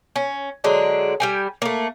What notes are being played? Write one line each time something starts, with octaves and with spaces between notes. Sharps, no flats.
C#4
D3 F#3 G#3 D4
G3 G4 G#5
A3 A#3